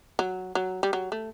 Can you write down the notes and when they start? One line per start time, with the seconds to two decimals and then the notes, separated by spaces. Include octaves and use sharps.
0.19 F#3
0.55 F#3
0.83 G3
0.93 F#3
1.12 A3